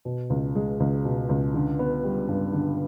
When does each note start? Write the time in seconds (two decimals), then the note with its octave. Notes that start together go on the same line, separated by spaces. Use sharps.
0.05 B2
0.30 C#2
0.55 G#3
0.80 C#2
1.05 B2
1.29 C#2
1.54 D3
1.79 B3
2.04 G3
2.29 G2
2.53 D3